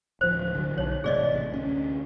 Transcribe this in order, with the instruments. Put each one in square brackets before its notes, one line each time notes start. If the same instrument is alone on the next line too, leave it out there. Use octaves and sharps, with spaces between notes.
[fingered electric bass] D1 F3 [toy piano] C5
[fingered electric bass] D3 F#3
[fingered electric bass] B1 [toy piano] D#4 C#5
[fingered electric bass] A1 C3 A3 [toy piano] G#4 D5 D#5
[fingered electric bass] D2 C#4